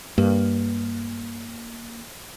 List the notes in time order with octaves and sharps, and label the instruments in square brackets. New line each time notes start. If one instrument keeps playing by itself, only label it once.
[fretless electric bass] G2 [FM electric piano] A#3